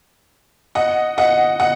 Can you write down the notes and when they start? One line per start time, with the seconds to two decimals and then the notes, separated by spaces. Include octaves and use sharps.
0.75 D#5 F#5
1.18 D#5 F#5
1.60 D#5 F#5